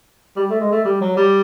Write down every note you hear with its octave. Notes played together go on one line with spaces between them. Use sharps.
G3
A3
G#3
A3
G3
F#3
G3